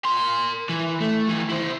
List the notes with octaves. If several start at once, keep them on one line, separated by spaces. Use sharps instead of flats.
A#4 C6
E3
A3
D#2 E3
E4 C5